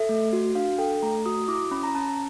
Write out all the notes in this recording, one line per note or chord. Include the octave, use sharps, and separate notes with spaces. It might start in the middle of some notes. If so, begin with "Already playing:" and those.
Already playing: A4 E5
A3
F#4
D4 F5
A4 G5
A3 A#5
F#4 D#6
E4 D6
C#4 B5
A#5
C#4 A5